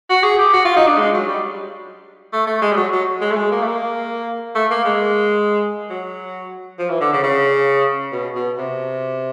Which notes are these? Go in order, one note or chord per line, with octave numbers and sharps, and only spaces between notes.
F#4
G#4
G4
F#4
F4
D#4
D4
G#3
F#3
G3
A3
A3
G#3
G3
F#3
F#3
G#3
A3
G#3
A#3
A3
A#3
A3
A#3
G#3
F#3
F3
E3
D3
C#3
C#3
B2
B2
C3